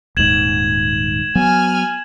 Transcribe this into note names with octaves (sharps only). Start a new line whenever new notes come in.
D#1 D#2 G#2 G#6 E7 F#7
F#3 B3 G#5 F6